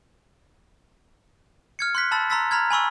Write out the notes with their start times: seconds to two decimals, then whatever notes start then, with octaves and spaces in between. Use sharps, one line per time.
1.79 F6 G#6 C#7
1.95 C6 F#6 B6
2.11 A5 B5 E6 A6
2.30 A#5 C6 E6 A6 B6
2.51 A#5 B5 F6 G#6
2.71 G#5 B5 C#6 E6